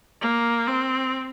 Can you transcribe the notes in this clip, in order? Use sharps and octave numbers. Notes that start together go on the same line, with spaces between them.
A#3
C4